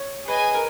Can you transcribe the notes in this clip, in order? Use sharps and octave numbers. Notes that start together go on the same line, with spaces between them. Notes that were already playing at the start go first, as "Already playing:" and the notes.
Already playing: C#5
G#4 B4 D#5 G#5
A#4